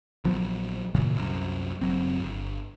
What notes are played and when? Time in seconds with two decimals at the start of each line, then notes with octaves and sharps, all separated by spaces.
0.25 A#1 F3 F#3 B3
0.95 F#1 A#2 C#3 E3
1.16 C2 F#2
1.81 F#1 F#3 C4
2.19 G1